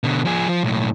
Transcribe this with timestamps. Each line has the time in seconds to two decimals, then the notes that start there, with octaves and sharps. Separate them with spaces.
0.04 B2 D3
0.25 F3 G#4
0.48 F3
0.63 B1 A2